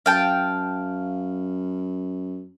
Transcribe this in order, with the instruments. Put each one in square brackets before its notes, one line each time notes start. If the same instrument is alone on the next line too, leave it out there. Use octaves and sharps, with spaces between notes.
[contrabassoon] F#2 [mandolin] F5 G5 A5